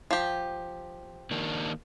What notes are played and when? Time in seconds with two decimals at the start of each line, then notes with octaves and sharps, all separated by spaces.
0.11 F3 G4
1.31 D#3 A#3 D4